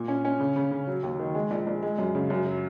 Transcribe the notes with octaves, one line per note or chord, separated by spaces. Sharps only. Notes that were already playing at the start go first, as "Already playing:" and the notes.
Already playing: A#2
C#4
C#4
C#3
C#3
C#3
F#3
D#2
D#3
G#3
A#1
A#1
G#3
F#2
C#3
F#2
F#3